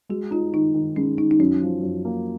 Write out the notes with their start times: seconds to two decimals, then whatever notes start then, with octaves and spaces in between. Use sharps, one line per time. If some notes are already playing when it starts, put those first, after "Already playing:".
0.09 G#3 F#4
0.31 D#4 F4
0.54 D#3 D#4
0.74 D#3
0.96 G#3 C#4
1.18 D#3 D#4
1.31 D#4
1.39 F#2 C#4
1.62 F3
1.83 F#2
2.05 A#3